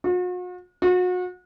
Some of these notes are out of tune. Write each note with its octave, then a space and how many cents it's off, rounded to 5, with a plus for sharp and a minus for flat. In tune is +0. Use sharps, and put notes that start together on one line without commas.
F#4 -45
F#4 -35